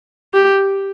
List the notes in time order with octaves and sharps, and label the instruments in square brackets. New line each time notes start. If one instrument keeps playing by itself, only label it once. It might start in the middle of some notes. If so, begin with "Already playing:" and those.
[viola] G4